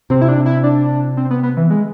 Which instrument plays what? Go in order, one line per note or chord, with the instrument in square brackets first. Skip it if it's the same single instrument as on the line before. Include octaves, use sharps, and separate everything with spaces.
[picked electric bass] C3 [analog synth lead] C4
[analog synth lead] E4
D4
E4
D4
C4
B3
B3
E3
G#3